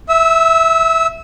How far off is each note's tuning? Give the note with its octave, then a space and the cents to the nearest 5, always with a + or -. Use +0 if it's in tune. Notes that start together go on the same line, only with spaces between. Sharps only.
E5 +0 E6 -30